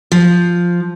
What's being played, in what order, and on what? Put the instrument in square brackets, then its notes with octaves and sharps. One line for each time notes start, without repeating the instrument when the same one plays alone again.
[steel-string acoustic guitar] F3